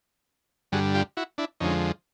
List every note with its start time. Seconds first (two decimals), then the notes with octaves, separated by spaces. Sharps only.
0.72 G2 D3 G3 F#4 G#4
0.95 F4 G4
1.17 E4 F#4
1.38 D4 E4
1.60 F2 D3 F3 G#3 C#4 D#4